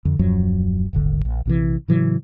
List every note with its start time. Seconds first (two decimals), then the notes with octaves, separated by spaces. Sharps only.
0.05 F2 D3
0.19 D#1 F#2 F3 F#3
0.93 D#1 G#1 D3
1.25 A#1
1.46 A#1 C3 E3
1.88 A2 C#3 E3 F#3